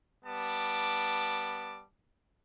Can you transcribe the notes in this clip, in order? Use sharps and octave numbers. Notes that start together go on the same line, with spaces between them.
G3 B3 A5 D6